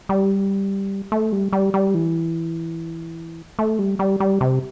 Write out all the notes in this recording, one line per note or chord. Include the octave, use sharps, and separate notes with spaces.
G3
A3
G3
G3
G3
E3
A3
G3
G3
G3
C3